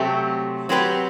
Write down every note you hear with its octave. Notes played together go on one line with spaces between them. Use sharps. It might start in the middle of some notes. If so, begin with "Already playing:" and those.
Already playing: C3 F#3 A3 C4 G4
F#3 C4 G4 B4